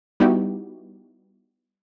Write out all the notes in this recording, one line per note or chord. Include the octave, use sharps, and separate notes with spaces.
G3 B3 D#4 E4 F#4 G4